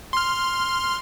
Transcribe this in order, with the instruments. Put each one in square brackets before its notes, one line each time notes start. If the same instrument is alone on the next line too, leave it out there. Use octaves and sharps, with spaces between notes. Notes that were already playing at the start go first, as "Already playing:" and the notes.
[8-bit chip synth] C6 F6